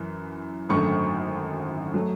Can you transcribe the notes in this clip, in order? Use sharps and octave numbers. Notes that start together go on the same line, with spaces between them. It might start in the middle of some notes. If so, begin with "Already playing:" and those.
Already playing: F#2 E3
G#1 F#2 D3 A3 C#6
F#3 A3